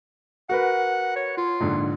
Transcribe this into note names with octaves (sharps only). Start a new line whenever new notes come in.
F#4 A#4 B4 F#5
C#5
F4
A#1 G#2 D3